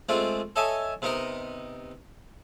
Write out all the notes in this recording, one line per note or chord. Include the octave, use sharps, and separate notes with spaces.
G#3 A3 C4 F4 D5
A4 C#5 D#5 E5 G#5 A5
C3 B3 D#4 A#4 D#5